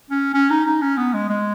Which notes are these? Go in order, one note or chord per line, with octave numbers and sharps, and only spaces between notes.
C#4
C#4
D#4
D#4
C#4
B3
G#3
G#3